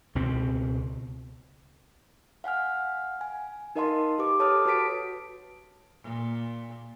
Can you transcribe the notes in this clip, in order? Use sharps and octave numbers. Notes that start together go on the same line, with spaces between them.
C#2 B2 C4
F5 F#5 G#5 F6
G#5
D#4 A#4 D#5 F5 A5 C6
G4 B4 D6
A4 C#5 A5 D6 D#6 F6
F#4 B4 A5 B6 D7
A#2